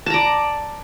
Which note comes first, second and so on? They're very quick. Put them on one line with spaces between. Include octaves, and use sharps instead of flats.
A5 A#5 D5